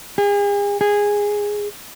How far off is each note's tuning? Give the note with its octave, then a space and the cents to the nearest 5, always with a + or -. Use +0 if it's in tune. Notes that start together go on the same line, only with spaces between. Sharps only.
G#4 -40
G#4 -10